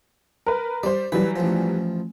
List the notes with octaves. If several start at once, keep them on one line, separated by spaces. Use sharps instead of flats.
A#4 B4
G3 C5 D5
E3 F#3 G3 B4
A1 F3